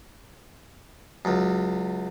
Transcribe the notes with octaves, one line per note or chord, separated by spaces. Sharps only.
C#2 F#2